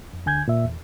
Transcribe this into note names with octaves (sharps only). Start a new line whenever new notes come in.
F2
D2 D3 G#5 G6 G#6
A#2 E5
E2